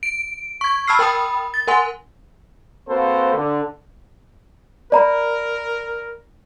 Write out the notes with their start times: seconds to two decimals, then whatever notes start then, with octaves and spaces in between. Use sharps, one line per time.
0.03 D7
0.61 C#6 G#6
0.87 A5 B5 E6 F6 C7
0.99 A#4 G5 B5 D#6
1.54 A6
1.68 A#4 F#5 G#5 C6
2.88 A#3 C4 F#4 A4 B4 C5
3.34 D3
4.92 A#4 D5 A#5 B5